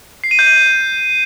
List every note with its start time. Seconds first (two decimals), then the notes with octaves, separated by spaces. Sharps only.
0.24 C7
0.31 D#7
0.39 G6
0.46 D#7